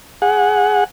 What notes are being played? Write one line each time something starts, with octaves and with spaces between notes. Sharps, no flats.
G#4 F#5